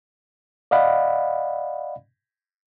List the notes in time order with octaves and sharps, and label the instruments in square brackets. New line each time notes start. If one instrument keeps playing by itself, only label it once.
[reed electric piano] D5 D#5 F5 F#5 B5